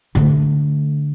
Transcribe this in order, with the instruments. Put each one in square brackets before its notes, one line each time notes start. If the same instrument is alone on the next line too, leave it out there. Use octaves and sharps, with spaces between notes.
[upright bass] D3 A3